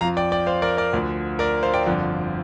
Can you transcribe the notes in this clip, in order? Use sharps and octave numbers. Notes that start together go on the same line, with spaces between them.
F2 F3 F5 A#5
D5 G5
D5 G5
C5 F5
A#4 D5
A#4 D5
D2 D3 F3
A#4 D5
C5 F5
D5 G5
G1 F2 D3 F3